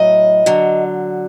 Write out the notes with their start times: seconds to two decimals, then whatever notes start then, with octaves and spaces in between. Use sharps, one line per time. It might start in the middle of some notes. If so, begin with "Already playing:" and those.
Already playing: A2 F#3 D#5
0.46 D3 F#3